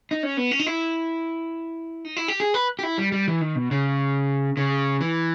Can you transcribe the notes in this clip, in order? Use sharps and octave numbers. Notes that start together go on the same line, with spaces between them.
D#4
C#4
B3
C#4
D#4
E4
D#4
E4
G4
G#4
B4
G4
E4
G3
G3
E3
D#3
B2
C#3
C#3
E3